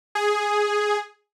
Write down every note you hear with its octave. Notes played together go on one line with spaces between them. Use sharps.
G#4